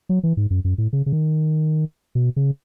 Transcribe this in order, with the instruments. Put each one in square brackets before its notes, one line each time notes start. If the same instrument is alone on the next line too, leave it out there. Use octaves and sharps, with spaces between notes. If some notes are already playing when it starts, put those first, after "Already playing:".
[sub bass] F#3
E3
G#2
F#2
F#2
A2
C#3
C#3
D#3
B2
C#3